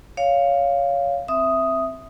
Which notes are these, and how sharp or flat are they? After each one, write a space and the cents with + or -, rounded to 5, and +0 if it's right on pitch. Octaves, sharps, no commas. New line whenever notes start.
C#5 +15 F5 +0
C4 +0 E5 +0 D#6 +0